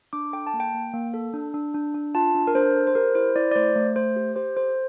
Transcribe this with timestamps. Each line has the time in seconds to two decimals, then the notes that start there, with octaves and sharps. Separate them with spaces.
0.13 D4 D6
0.33 A4 G5
0.47 A5
0.54 A#3
0.60 G5
0.74 A#3
0.93 A#3
1.14 A4
1.34 D4
1.54 D4
1.74 D4
1.94 D4
2.15 F4 A5
2.35 D4
2.47 A#4
2.55 D4 C5
2.76 A4
2.87 C5
2.95 G4 A#4
3.15 E4 C5
3.36 E4 D5
3.52 D5
3.56 A3 C5
3.76 A3
3.96 A3 C5
4.16 G4
4.36 G4 C5
4.56 A4 C5